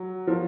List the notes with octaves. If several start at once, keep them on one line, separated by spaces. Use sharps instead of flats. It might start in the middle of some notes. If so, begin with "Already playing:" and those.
Already playing: F#3
F3